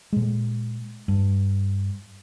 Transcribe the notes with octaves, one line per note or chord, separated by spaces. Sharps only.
A#2 G#3
G2